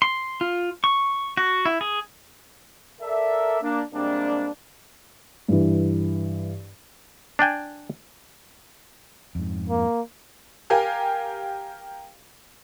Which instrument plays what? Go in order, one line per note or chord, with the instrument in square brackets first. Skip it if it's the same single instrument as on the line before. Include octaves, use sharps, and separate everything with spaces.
[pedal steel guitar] C6
F4
C#6
F#4
E4
G#4
[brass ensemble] A4 A#4 D5 E5
A#3 D4
C3 G3 G#3 A#3 C4 D4
[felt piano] G2 E3
[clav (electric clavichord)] D4 D5 G5 G#5
[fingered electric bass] F2 G#2
[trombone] A#3
[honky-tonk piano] G4 A#4 F5 G#5